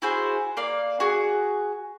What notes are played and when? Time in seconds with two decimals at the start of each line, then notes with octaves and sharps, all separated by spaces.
0.02 E4 F#4 G#4 C5
0.57 A#3 D5 F5
1.00 F#4 G#4